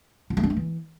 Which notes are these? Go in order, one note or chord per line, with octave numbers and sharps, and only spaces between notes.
F4
A3
D4
A3
E3